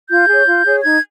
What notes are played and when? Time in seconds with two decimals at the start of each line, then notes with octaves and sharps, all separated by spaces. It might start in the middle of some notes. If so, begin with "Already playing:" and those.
0.09 F4 G6
0.28 G#4 C#5
0.46 F4
0.65 G#4 C#5
0.83 D#4 G#6